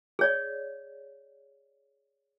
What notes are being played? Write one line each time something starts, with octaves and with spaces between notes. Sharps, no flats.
G#4 C#5 D5